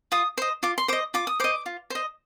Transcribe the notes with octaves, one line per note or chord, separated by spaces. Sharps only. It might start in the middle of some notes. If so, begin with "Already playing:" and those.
F4 D#6
C5 D#5
F4 D6
C6
C5 D#5 D6
F4 D6
D#6
C5 D#5 D6
F4
C5 D#5